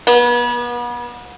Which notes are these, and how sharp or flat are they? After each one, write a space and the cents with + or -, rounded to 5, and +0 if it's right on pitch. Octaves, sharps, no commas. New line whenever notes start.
B3 -35